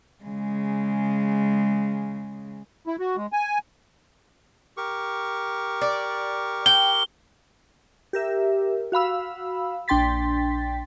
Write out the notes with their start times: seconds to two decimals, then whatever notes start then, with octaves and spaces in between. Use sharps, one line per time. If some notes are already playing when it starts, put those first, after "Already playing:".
0.24 C#3 G#3
2.87 E4
2.99 F#4
3.17 G#3
3.33 G#5
4.77 G4 A#4 C#6
5.81 D5
6.66 G5 G7
8.13 G4 A#4 E5
8.92 F#4 F5 B5 E6
9.88 A#1 D4 G5 C6 A6 B6